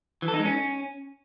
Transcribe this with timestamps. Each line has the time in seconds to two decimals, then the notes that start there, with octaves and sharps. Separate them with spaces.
0.22 E3
0.28 A4
0.34 D#4
0.40 G#3
0.45 C#4